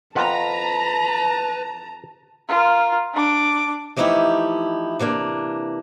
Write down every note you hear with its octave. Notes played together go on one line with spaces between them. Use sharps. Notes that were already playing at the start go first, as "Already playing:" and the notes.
F2 F4 B4 F#5 A5 A#5
F4 A#4
D4 D6
E3 F3 A3 D#4 E4 G4
C3 E3 A#3 D4